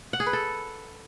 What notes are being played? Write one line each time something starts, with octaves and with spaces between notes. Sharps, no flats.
F#5
G#4
B4
A4